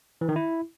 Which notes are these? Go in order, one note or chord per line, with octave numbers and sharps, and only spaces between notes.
E3
D#3
E4